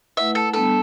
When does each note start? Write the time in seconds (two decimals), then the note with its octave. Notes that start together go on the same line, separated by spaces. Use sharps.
0.17 A3 E4 B4 E5 F#5
0.35 A4
0.53 G3 B3 D4 A4